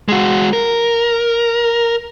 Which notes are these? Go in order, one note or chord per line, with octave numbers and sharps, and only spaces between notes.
G#3 F#4
A#4